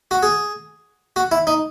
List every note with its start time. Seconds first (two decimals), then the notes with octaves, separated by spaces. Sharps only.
0.11 F#4
0.23 G#4
1.16 F#4
1.32 E4
1.47 D#4